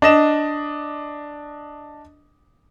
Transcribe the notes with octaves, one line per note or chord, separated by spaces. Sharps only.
D4 D#5 E7